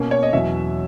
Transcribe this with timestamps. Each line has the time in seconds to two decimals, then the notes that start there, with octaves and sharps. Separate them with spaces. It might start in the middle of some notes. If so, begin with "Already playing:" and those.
Already playing: B2 A#3 C#4
0.11 C#5
0.23 D#5
0.33 E2 B2 F#3 C#4 E5